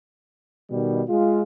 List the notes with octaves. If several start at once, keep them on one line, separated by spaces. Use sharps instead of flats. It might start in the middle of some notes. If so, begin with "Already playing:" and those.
B2 D#3 G3
G#3 F4